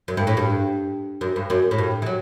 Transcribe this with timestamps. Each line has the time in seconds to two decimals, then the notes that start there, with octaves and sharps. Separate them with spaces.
0.08 F#2
0.17 G2
0.27 A2
0.37 G2
1.21 F#2
1.36 G2
1.50 F#2
1.71 A2
1.78 G2
2.02 E3
2.06 F#3